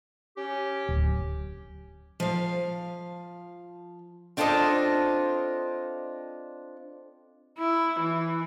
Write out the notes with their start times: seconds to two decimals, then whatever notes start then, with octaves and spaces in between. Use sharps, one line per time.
0.37 C#4 G4
0.89 D1
2.20 F3 F5
4.37 C4 D4 F4 A4 C5 D#5
7.58 E4
7.99 E3